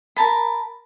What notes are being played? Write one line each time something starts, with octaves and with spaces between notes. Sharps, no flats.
A#4 A5 B5